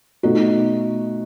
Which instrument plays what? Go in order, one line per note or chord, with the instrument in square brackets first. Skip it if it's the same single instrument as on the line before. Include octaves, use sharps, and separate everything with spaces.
[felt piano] B2 A3 D#4 F#4